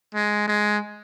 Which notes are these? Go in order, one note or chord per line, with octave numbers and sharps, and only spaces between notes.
G#3
G#3